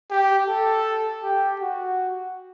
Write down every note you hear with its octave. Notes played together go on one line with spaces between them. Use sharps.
G4
A4
G4
F#4